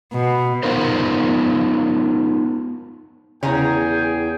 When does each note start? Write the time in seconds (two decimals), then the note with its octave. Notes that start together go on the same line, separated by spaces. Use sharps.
0.13 B2
0.63 B3 D#4 F4 A#4 C5
3.43 E2 C#3 G#4 C#5 G5 G#5 A#5